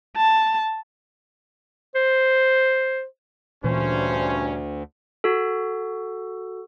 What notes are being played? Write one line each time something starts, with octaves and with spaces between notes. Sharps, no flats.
A5
C5
D2 G2 A#2 E3 C#4 C5
F#4 A4